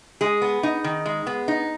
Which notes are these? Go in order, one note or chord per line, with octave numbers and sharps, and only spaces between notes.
G#3 G#4
B3
D#4
D#3
G#3
B3
D#4